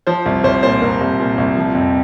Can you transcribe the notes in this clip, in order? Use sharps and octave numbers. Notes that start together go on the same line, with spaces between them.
F3 C5
C2
C2 C5
A#2 C5
C2 A#4
C2
A#2
C2
F3
F2